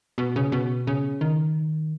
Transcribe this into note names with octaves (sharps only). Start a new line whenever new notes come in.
B2
C#3
B2
C#3
D#3